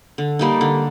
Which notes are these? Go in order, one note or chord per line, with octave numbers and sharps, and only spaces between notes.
D3
G3 A#3 D#4
D3